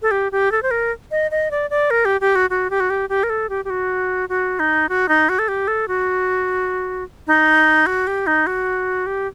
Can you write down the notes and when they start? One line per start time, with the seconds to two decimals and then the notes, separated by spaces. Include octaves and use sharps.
0.02 A4
0.11 G4
0.32 G4
0.52 A4
0.63 C5
0.71 A#4
1.11 D#5
1.31 D#5
1.51 D5
1.70 D5
1.91 A#4
2.05 G4
2.21 G4
2.36 F#4
2.50 F#4
2.70 G4
2.80 F#4
2.90 G4
3.09 G4
3.23 A#4
3.30 A4
3.49 G4
3.65 G4
3.70 F#4
4.29 F#4
4.59 D#4
4.89 F#4
5.09 D#4
5.29 F#4
5.39 A4
5.48 G4
5.68 A4
5.88 F#4
7.27 D#4
7.86 F#4
8.07 G4
8.27 D#4
8.47 F#4
9.06 G4